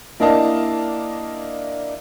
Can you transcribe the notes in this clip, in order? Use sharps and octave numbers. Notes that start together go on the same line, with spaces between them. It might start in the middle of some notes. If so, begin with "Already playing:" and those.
A#3 D4 E4 D#5 F5 A5